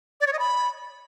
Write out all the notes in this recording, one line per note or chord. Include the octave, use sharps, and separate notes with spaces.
D5
C#5
D#5
B5